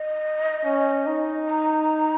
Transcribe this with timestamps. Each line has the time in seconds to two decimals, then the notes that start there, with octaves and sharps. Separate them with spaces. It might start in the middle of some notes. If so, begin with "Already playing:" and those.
Already playing: D#5
0.64 C#4
1.07 D#4
1.48 A#5